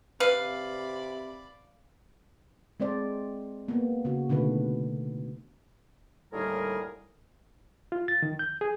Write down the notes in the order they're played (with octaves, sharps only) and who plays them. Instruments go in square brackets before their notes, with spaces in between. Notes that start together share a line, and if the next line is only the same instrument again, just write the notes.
[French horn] C3 [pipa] B4 [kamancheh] D5 B5 [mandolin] F5
[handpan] G#3 C4 C5 D5
A#3 B3
C#3 F#4
B2 D3 D#3 A3 B4
[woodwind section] D#2 A2 D3 G3 G#4 A#4
[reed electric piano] F4
A6
D#3
G6
G#4